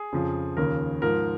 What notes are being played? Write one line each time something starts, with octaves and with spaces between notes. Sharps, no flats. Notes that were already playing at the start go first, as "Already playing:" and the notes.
Already playing: G#4
F2 C#3 F3
D#2 C#3 F3 A#4
G#2 F3 A#4